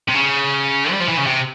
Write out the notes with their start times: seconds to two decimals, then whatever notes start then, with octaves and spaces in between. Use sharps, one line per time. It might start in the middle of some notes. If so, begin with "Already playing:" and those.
0.08 C3
0.15 C#3
0.91 G3
1.01 F3
1.09 E3
1.18 C#3
1.27 C3